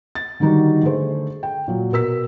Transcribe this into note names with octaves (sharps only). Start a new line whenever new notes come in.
A6
D3 D#3 G3 D#4 F#4
D3 A3 G#4 C5
G5
A#2 F#3
B2 A#4 E6 B6